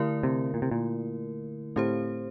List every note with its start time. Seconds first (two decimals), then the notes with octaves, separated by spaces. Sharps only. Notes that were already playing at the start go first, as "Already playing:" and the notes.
Already playing: D3 A3 E4 A#4
0.23 C3
0.54 A#2
0.62 C3
0.71 A#2
1.76 A2 C4 G4 C5